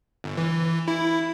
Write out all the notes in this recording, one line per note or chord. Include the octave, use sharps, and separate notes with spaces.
G1
E3
E4